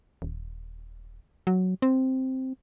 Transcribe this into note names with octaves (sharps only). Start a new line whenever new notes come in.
D#1
F#3
C4